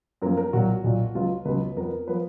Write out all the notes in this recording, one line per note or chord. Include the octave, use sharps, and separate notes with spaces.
F#2 F3 A#3 A#4
A#4
B1 A#2 F#3 F#4
B1 A#2 F#3
C#2 C#3 F#3 B3 F4
C#2 C#3 F#3 B3 B4
F2 F3 B3 A#4
F3 B3 B4